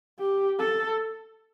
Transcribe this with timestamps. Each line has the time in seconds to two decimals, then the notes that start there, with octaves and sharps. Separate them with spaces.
0.19 G4
0.59 A4